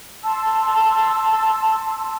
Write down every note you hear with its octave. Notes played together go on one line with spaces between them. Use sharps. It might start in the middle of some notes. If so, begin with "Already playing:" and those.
A5 C6 E6